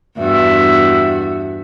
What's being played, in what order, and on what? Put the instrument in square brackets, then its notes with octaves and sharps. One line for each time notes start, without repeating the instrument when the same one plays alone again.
[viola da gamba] E2 G2 F#4 [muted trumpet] E5